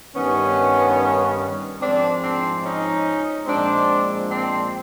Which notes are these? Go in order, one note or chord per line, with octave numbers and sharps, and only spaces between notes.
G2 D#3 G3 B3 C#4
G#2 F3 G#3 C4 D4
C4 D4
C#4 D#4
A#2 F3 G#3 C4 D4
C4 D4